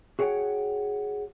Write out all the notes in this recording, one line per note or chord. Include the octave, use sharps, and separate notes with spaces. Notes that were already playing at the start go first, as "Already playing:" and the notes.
F#4 G#4 C#5 F#5 G5